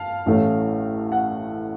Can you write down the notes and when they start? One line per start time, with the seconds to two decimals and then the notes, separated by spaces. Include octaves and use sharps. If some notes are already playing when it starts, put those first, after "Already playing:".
Already playing: F5 A5
0.26 A1 A2 A3 C#4
1.12 F#5